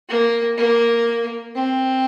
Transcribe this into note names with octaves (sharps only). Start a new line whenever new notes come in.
A#3
A#3
C4